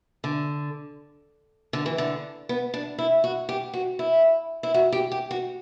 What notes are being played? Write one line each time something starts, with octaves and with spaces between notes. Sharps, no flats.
D3
D3
E3
D3
B3
D4
E4
F#4
G4
F#4
E4
E4
F#4
G4
G4
F#4